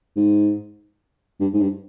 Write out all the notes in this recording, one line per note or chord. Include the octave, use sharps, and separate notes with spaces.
G#2
G2
G#2
G2